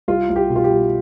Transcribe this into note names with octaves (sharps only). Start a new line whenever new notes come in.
C2 F4
C2
G4
B2
F4
G4
G3